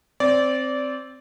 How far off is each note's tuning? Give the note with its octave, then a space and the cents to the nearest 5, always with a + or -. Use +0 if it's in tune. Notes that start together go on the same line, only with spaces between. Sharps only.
C4 +0 D5 -20